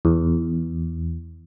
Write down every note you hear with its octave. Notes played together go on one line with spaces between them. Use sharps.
E2